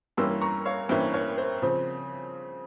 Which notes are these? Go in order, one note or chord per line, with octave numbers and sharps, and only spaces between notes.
G2 E3 G3 A#3 C#4 C6 E6
A#5 C#6
C#5 F5
G2 E3 G3 A#3 C#4 C5 E5
A#4 C#5
C5
C#3 F3 C4 C5